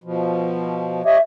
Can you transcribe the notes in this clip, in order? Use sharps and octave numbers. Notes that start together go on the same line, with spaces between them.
B2 F3
G4 C#5 D#5 E5